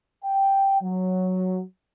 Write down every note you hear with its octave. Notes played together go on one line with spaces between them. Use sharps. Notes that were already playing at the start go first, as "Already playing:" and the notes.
G5
F#3